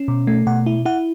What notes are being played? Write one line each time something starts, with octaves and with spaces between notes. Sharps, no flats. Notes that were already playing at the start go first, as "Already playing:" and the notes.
Already playing: C#4
B2
A3
B2 F#5
E4
E4 F#5